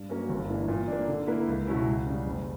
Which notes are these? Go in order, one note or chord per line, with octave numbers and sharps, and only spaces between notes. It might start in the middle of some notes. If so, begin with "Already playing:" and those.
Already playing: G2
F#3 A#3 C#4
G1
G2 E3 A#3
A#2
A#3 D4
D3
A#3 E4 B4
C#2
B2 F#3 C#4 E4
C#2
C#3 G3
F#1